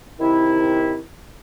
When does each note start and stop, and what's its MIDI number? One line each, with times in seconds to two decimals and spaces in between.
0.20 0.98 48
0.20 0.98 51
0.20 0.98 64